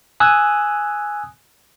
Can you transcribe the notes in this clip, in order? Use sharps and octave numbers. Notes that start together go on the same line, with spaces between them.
G#5 D#6 E6 F#6